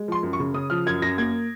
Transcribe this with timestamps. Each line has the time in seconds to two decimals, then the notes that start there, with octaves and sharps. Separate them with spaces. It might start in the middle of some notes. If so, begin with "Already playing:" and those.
Already playing: G#3
0.08 F3 C6
0.23 F#2
0.33 C#6
0.40 C#3
0.54 C#3 D#6
0.70 F3 F6
0.86 F#2 G#6
1.02 F#2 A#6
1.18 A#3 G#6